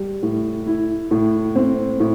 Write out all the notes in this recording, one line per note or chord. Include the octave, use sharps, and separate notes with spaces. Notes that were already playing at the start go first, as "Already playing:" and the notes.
Already playing: G3
A2
E4
A2
C4
A2